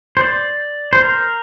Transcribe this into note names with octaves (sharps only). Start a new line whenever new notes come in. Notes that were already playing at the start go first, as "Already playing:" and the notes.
C5
D5
C5
A#4